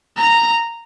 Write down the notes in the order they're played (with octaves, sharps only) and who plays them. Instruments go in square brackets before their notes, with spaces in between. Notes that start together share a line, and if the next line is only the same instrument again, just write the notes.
[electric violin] A#5